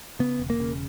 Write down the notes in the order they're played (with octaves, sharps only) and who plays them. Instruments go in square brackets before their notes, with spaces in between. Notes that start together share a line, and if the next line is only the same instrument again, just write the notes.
[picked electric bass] C#3 B3
E1
A#3
C#3